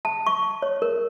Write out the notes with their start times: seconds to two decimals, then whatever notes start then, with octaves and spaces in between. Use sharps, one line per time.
0.05 A5
0.26 C#6
0.62 C#5
0.82 A#4